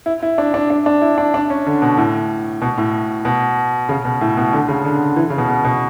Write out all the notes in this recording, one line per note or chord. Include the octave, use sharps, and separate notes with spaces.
E4
E4
D4
D4
D4
D4
E4
D4
D4
C#4
D3
B2
A2
B2
A2
B2
C#3
B2
A2
B2
D3
C#3
D3
E3
C#3
B2
B2
B2